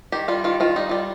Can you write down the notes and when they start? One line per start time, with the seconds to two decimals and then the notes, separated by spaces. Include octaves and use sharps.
0.12 D#3 G4
0.28 G3 F4
0.44 D#3 F4
0.60 D#3 F4
0.76 G3 D#4
0.89 G3 F4